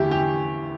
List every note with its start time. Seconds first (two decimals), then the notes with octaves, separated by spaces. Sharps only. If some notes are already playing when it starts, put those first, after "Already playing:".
Already playing: E2 D3 A3 E4 G4
0.11 G4